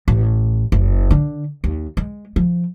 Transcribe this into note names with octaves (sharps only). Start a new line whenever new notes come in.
A1
F#1
D3
D#2
G#3
F3